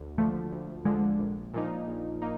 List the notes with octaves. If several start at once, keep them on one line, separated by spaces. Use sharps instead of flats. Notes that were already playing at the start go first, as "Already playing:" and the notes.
Already playing: D2
D3 F3 A3
D2
D3 F3 G#3
A#1
A#2 F3 A#3 D#4
A#1
A#3 D#4